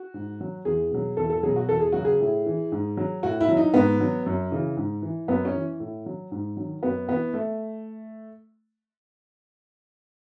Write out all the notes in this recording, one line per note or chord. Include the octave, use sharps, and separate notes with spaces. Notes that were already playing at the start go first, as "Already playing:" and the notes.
Already playing: F#4
G#2
F#3
E2 G#4
B2 F#3
E2 A4
A4
B2 F#3 G#4
F#4
E2 A4
G#4
F#3 F#4
C#3
G#4
A2
E3
G#2
F#3
A2 F#4
E4
F#3
D#4
G#2 B3
F#3
F#2
C#3 E3
G#2
E3
F#2 B3
C#4
E3
A2
F#3
G#2
D#3 F#3
F#2 B3
E3 B3
A3